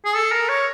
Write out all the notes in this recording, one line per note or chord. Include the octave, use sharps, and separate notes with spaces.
G#4
A4
A#4
C#5